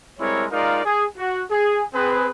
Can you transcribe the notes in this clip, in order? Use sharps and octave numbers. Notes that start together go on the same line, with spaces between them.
G3 G#3 C4 E4 A#4 C#5
G#3 D#4 F4 A#4 D5 F5
G#4
F#4
G#4
C4 G#4 B4